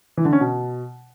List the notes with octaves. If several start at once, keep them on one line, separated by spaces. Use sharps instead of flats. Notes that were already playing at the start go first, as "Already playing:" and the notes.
E3
D3
C#4
B2